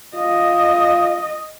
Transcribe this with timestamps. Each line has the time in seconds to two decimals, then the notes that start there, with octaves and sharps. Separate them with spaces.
0.15 F4 D#5